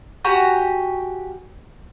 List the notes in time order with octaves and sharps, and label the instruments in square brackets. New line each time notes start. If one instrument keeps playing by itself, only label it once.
[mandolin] F#4 G4 G#5 A#5